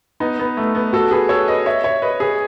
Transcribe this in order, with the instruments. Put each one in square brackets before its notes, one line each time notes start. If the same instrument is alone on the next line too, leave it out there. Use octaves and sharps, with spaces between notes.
[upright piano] B3 D#4
B3
A3
B3
F#4 A4
G#4 B4
A4 C#5
B4 D#5
C#5 E5
C#5 E5
B4 D#5
G#4 B4